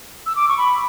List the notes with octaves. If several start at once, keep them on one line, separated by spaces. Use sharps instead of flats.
E6
D6
C#6
B5